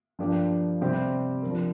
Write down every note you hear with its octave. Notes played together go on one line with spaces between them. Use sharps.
G2 F3 A#3 D4 G4
C3 G3 C4 G4 C5
F3 D4 A#4